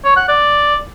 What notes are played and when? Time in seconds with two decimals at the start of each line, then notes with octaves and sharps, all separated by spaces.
0.05 C#5
0.17 F#5
0.29 D5